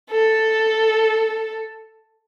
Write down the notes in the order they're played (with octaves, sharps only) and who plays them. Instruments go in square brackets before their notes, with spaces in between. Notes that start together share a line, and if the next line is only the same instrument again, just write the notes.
[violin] A4